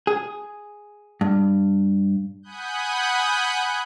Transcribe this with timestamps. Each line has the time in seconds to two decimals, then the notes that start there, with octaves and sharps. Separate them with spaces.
0.07 G#4
1.21 G2
2.43 F#5 G#5 B5 D#6 F#6 G6